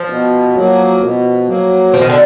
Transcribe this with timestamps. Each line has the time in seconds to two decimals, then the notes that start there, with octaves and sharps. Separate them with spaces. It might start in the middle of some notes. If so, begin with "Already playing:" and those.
Already playing: F3
0.10 B2
0.55 F#3 A#3
1.02 B2
1.47 F#3 A#3
1.93 B2 F3
2.01 D#3
2.10 D3